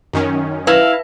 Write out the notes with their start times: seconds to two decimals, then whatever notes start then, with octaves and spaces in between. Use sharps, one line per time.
0.13 F#2 D#3 C#4
0.67 E4 B4 F5